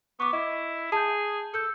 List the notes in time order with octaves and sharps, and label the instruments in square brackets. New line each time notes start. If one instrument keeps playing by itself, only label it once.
[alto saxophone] B3 [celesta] C#6 D6
[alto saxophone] E4 [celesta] D#5
[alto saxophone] G#4 [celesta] A5 G6
[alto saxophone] A4 [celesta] E6 G6